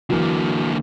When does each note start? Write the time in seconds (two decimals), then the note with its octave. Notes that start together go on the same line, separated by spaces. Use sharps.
0.10 D3 E3 F#3 A#3